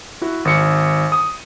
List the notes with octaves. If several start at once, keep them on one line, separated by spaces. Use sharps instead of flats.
E4 F#4
G#1 C#7
D#6